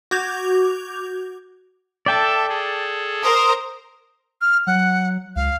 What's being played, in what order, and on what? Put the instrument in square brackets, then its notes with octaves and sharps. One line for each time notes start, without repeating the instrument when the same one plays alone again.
[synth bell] F#4 D6 G6 G#6 F7
[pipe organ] A4 E5 [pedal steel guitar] D5 G5 A5
[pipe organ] G#4 A4
[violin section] A#4 C5 A#5 [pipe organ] C6 [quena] D#6
[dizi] F6
[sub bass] F#3 [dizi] F#5
[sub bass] C#2 [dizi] F5